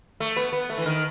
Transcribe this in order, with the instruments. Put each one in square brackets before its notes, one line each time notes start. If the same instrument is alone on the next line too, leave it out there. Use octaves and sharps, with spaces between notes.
[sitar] A3
B3
B3
A3
E3
D#3